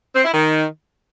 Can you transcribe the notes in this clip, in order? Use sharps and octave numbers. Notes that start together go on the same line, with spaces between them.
C4
E4
D#3